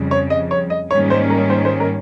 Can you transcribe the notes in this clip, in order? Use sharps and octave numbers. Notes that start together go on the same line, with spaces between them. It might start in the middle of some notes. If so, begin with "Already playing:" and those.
Already playing: F2 C#3 G3
C#5
D#5
C#5
D#5
G#2 D#3 G3 A#3 C#4 C#5
C5
A#4
C5
C5
A#4